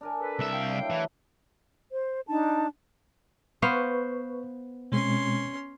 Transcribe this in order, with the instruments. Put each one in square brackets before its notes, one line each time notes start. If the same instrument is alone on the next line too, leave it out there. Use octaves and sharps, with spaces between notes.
[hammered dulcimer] D4 A#4 G#5
[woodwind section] A4 B4
[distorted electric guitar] C2 E5
[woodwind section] F5 G5
[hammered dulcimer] F#3 A3 E4
[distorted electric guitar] E3
[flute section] C5
D4 D#4 A5
[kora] B3 C5 F5 [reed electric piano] B4 C#6
[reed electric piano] B2 G#3 C4 [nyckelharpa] C#4 C6